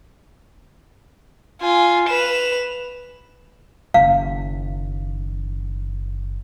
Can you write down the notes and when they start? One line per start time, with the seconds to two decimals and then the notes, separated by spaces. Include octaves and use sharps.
1.62 F4 G#5
2.09 B4 E7 F7
3.94 F#1 D#3 F5